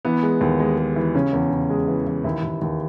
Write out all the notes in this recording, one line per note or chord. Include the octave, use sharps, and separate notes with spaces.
E3 B3
G#3
D#2
G#3
G#3
E3
C#3 C#4
E2
C#3
G#3
E3
E3
D#2 E4
D#2
D#2